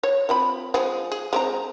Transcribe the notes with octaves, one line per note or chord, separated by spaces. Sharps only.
C#5
F3 C4 B5
F3 G#3 G#4
G#4
G#3 C4 A#5